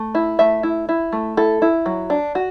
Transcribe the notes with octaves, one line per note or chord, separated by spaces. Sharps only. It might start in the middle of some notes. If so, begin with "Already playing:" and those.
Already playing: A3
E4
A3 E5
E4
E4
A3
E4 A4
E4
F#3
D4
F#4